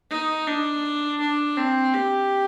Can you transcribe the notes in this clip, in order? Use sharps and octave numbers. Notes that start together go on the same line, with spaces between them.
D#4
D4
D4
C4
G4